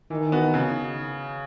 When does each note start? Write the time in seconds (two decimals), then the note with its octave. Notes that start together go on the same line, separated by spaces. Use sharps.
0.10 D#3 E3
0.32 B3 F#4
0.54 C#3